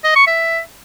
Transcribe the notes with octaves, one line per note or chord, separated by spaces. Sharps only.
D#5
C#6
E5